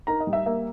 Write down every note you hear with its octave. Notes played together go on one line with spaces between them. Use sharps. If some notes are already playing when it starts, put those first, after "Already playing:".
D#4 A#4 A#5
D#5
G3
E5
A#3 E5